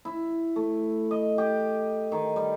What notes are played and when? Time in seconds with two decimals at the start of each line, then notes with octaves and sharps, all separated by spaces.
0.05 E4
0.56 A3
1.11 D#5
1.38 G4
2.12 D#3
2.36 G3